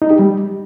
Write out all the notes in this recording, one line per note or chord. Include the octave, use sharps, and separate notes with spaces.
D#4
G4
G3